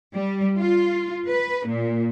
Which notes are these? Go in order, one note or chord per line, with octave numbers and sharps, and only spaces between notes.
G3
F4
B4
A#2